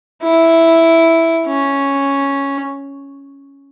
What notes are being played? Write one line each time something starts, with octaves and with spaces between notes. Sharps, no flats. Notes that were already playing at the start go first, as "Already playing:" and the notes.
E4
C#4